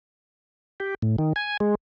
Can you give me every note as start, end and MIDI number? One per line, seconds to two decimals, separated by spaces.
0.80 0.94 67
1.02 1.16 45
1.18 1.33 51
1.36 1.57 80
1.60 1.75 56